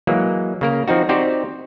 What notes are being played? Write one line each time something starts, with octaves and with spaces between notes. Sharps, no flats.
E3 F#3 G#3 A#3
C#3 A#3 A#4
F3 C4 D#4 F#4
C4 D#4 F#4 G4 C5 D5